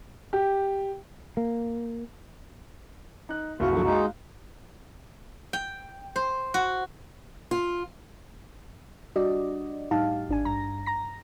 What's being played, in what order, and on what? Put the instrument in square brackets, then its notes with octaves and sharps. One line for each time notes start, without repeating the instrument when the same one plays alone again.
[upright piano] G4
[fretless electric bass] A#3
[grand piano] D#4 F#6
[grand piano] F#1 C2 [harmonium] F4 [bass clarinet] F#4
[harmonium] D3 F3 F#3
[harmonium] G#3 D#4 [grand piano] F5
[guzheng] G5
C5
F#4
[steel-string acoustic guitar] F4
[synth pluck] G3 D4 F#4 D5 D#5
A2 G3 D#4 G4 F5 A5
G#1 D4 G#5
G2 A#5 A#6
A#5 A#6